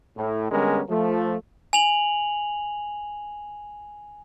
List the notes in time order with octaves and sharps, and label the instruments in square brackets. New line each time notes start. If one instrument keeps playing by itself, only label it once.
[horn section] A2
D3 G3 G#3 B3 C#4 A#4
F3 A3
[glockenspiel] G#5 F7 F#7